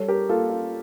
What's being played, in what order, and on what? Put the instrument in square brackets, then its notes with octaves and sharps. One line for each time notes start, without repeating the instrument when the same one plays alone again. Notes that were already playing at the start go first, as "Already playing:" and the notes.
Already playing: [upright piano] G3 A4 C#5
G4 A#4
A#3 F4 A4
F4